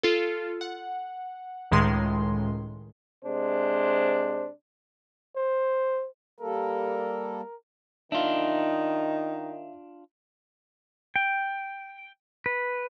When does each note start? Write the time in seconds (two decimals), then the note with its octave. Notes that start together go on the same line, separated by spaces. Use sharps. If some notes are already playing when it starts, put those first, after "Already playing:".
0.03 F4 A4
0.61 F#5
1.71 C#2 A2 D#3 G#3 C6
3.24 C3 G#3 D4 C5
5.36 C5
6.40 G3 A#3 A4 A#4
8.12 D#3 D4 D#4 F4 E5 F5
11.16 G5
12.46 B4